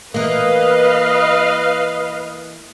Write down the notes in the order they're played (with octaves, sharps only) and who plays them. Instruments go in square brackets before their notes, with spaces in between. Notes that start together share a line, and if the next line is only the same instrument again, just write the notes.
[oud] E3 A#3 [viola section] B4 D#5 F5